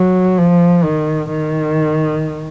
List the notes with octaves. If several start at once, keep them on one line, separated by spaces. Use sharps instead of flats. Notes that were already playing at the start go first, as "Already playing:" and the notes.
Already playing: F#3
F3
D#3
D#3